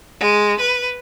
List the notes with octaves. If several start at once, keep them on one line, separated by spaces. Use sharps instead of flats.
G#3
B4